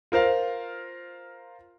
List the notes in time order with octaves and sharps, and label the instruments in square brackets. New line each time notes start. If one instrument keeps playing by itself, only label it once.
[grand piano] F4 A#4 C5 F5